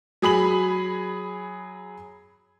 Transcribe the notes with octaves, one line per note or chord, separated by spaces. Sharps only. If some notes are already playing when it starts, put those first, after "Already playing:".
F#3 G#4 B5 F#7